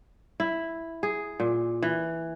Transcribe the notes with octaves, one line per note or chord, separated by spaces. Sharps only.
E4
G#4
A#2
E3